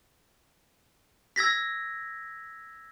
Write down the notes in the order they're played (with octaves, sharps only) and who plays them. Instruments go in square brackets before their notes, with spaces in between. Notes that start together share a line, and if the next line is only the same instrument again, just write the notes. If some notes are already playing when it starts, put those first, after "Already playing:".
[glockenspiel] E6 G#6 A#6 B6